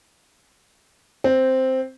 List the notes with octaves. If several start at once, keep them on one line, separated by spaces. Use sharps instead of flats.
C4